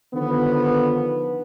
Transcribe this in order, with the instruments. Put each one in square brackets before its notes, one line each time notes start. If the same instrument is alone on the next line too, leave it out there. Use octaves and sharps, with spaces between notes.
[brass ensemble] D3 D#3 F3 B3